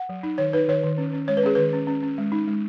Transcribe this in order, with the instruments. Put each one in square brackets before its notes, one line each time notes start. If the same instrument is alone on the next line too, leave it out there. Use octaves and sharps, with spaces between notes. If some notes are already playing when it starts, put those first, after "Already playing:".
Already playing: [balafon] F#5
F#3
D#4
D#3 C#5
D#4 B4
D#3 C#5
D#3
C#4
C#4
G#3 C#5
B4
C#4 G#4
D#3 B4
C#4
C#4
C#4
G#3
D#4
G#3